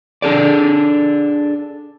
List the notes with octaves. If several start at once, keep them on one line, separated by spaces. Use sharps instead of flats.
D4 G#4 A4 D5